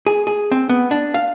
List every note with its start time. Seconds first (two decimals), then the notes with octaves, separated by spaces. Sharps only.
0.07 G#4
0.27 G#4
0.51 C4
0.69 B3
0.91 D4
1.14 F5